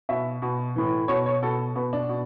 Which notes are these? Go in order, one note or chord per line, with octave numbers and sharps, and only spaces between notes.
B2 E5
B2
A2 E3
B2 C#5
C#5
B2 A4
B2 B3
D4
B2